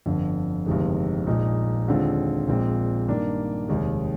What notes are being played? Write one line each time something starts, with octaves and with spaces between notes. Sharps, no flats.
G1 F2 D3
G1 F2 C3 D#3 G#3
A#1 A#2 F3 G#3 D#4
D#2 D3 G#3 C4 F4
A#1 A#2 G#3 C4
G2 D#3 A#3 D4
F1 D#2 D#3 G#3